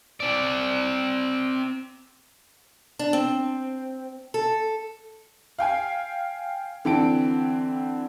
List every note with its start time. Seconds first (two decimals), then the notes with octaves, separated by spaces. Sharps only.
0.20 C4 D5
2.99 D4
3.13 C4
4.34 A4
5.58 F5 G5 G#5
6.85 D3 E3 C4 G5 A5 D7